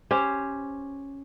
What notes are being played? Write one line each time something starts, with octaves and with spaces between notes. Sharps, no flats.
C#4 G4 C5 C#5